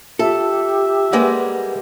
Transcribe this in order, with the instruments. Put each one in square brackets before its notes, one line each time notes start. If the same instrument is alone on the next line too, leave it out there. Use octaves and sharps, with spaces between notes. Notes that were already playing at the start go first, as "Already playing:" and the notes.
[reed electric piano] F4 A5 [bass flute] G4 [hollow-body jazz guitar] A4 [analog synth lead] E5
[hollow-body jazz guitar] G3 G#3 A#3 [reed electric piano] B4 F#5